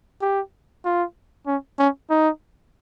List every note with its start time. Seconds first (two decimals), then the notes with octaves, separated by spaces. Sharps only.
0.21 G4
0.85 F4
1.47 C#4
1.79 C#4
2.10 D#4